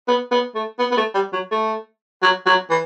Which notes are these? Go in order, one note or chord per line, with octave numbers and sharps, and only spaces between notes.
B3
B3
A3
B3
B3
A3
G3
F#3
A3
F#3
F#3
E3